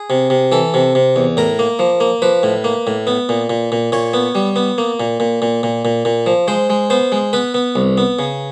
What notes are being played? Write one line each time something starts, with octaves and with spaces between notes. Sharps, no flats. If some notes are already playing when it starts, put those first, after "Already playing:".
Already playing: G#4
C3
C3
E3 A4
C3
C3
E2
A2 A#4
A#3
F3
A#3
F3 B4
A2
A#3
A2
B3
A#2
A#2
A#2
A#2 C#5
B3
G3
B3
A#3
A#2
A#2
A#2
A#2
A#2
A#2
F3
G#3 C5
G#3
B3 C5
G#3
B3 B4
B3
C2
B3
C#3